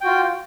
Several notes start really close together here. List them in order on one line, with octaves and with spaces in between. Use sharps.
G5 F#4 F4